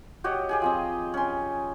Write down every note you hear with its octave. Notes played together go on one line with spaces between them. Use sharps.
F#4 G4 C#5 D#5
G4 G#4 G#5
F3 C4 D#5
C#4 C6